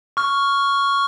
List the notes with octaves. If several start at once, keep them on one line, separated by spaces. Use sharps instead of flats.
C#6 F6